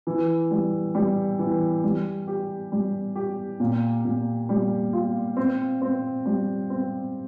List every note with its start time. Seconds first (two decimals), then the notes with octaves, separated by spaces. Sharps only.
0.07 E3
0.51 G3
0.95 G3
1.39 E3
1.84 G3
2.28 G4
2.72 G3
3.16 G4
3.60 A#2
4.05 A#2
4.49 G3
4.93 F4
5.37 C4
5.81 C4
6.26 G3
6.70 C4